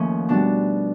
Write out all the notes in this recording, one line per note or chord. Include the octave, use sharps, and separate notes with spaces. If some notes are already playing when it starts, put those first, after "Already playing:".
Already playing: D#2 F3 A3 C#4
B2 G3 D4